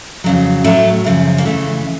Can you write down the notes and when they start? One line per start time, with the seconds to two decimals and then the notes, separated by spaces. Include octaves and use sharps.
0.24 F2 C#3 F#3
0.64 A2 F#3 A3
1.05 F#2 C#3 F3
1.38 A#3
1.45 F2 C#3 E3 A3